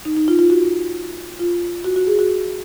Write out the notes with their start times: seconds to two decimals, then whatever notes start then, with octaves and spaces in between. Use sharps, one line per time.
0.05 D#4
0.17 D#4
0.28 F4
0.39 F4
0.50 F#4
1.39 F4
1.84 F#4
1.96 F#4
2.07 G#4
2.19 F#4